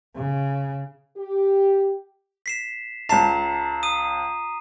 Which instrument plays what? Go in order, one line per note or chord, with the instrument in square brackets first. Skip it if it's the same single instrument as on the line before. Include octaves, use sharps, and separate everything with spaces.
[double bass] C#3
[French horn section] G4
[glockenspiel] B6 C7 E7
[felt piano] C#2 A5 [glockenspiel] A#5 C7 E7
[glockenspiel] D#6 D#7